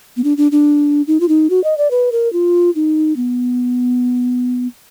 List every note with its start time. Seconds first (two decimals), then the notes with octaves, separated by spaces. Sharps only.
0.17 B3
0.24 D4
0.37 D4
0.52 D4
1.07 D#4
1.20 F4
1.29 D#4
1.50 F#4
1.64 D#5
1.78 D5
1.91 B4
2.12 A#4
2.33 F4
2.75 D#4
3.17 B3